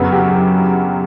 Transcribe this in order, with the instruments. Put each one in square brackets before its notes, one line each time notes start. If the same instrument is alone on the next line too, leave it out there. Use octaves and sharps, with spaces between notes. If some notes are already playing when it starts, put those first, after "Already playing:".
Already playing: [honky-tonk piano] F#2 C#3 F#3 B3 F#4
G4